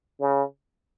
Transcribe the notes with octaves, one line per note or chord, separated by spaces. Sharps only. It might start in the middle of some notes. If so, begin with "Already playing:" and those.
C#3